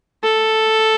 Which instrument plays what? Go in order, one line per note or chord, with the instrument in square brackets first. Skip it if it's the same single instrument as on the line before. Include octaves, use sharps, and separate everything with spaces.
[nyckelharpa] A4